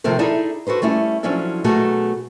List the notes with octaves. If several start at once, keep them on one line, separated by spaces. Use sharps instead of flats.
C3 D#3 F3 A3 C4 A4
D#4 E4 G#4 A4 D5 E5
F#4 A4 B4 C5
G3 A3 C#4 E4
F3 F#3 C#4 D4 E4 A4
B2 F#3 A3 F#4 G#4 A4